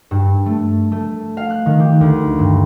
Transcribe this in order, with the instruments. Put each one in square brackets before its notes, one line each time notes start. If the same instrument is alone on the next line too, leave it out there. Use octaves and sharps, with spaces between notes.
[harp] G2
A3
A3
F5
F#6
D#3
G4
D2
G2